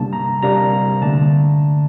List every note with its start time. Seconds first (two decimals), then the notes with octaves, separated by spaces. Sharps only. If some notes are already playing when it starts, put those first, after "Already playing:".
Already playing: C3 G3 A#3 D4 A5
0.13 A#5
0.42 C3 G3 A#3 D4 A#5
1.02 D3 A3 D4 A5